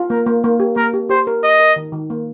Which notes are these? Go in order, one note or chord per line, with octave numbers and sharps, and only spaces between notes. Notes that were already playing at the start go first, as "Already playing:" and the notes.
Already playing: F4
A#3 A#4
A#3
A#3
G4
A#3 A#4
G4
G4 C5
A#4
A#4 D#5
A#4
D#3
D#3
A#3